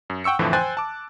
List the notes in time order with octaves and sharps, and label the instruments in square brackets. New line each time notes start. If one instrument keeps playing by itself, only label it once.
[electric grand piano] F#2
F#5 G5 C#6 E6 C#7
F2 A2 D3 E3 F3
C5 G5 G#5 F#6 A6
A5 D6